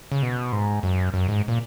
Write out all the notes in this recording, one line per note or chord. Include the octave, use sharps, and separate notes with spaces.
C#3
B2
G#2
F#2
F#2
G#2
A#2